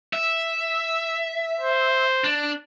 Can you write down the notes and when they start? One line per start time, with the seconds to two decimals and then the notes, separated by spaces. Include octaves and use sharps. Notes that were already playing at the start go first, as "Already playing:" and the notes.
0.13 E5
1.60 C5
2.25 D4